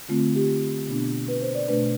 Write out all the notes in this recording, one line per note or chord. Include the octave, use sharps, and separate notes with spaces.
D3 A3 C4 F4
G4
B2 B3 D4
B4
C5
D5
B2 A3 D4 B4